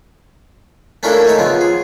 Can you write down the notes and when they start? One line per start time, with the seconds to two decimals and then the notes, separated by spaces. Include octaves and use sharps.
1.03 A3 A#3 C#4 D4 E4 A4
1.25 A3 D#4 C#5
1.37 C#3 F3 B3
1.61 G#4